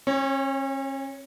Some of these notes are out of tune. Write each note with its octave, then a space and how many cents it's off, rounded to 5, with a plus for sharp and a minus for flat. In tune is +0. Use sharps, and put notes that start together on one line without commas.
C#4 -40 C#5 +0